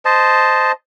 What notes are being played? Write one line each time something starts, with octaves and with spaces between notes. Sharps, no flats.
C5 D#5 A5